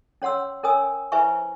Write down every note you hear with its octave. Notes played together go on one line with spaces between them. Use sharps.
C#4 C#5 F#5 C6 E6
C#4 A#4 C#5 G#5 D#6 E6
E4 B4 C5 E5 G#5 C#6